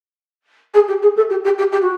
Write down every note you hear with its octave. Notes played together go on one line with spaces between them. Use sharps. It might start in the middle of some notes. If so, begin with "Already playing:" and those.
G#4
G4
G#4
A4
G4
G4
G4
G4
F#4